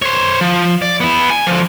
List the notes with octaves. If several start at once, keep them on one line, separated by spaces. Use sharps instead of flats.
C5 C#5
F3
D5
B3 E4
G#5
D3 F3